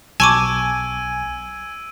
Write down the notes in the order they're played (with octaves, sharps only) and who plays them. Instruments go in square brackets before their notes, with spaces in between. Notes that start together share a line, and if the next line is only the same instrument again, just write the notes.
[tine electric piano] B1 [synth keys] G#5 [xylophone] A5 C#6 D6 [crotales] E6 D7 D#7